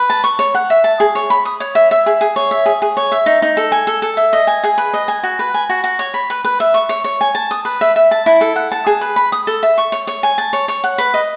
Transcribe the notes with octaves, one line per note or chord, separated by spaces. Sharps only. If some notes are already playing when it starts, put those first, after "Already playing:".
Already playing: B4
A5
C#6
C#5
F#5
E5
A5
G#4
C#5
B5
D#6
C#5
E5
E5
G#4
G#4
C#5
E5
G#4
G#4
C#5
E5
D#4
D#4
A4
G#5
A4
A4
E5
D#5
G#5
G#4
B4
D#5
G#5
F#4
B4
G#5
F#4
F#4
C#5
B5
B4
B4
E5
C#6
C#5
C#5
G#5
A5
D#6
B4
E5
E5
A5
E4
A4
F#5
A5
G#4
B4
B5
D#6
A4
E5
C#6
C#5
C#5
G#5
A5
C#5
C#5
F#5
B4
D#5